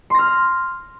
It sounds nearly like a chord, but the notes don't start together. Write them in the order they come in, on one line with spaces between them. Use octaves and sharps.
C6 A#6 F6